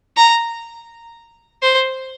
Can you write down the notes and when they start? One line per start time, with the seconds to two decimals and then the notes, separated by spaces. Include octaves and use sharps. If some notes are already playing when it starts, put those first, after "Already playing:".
0.17 A#5
1.62 C5